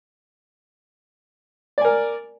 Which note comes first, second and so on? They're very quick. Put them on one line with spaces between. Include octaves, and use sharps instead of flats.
D5 G#5 A#4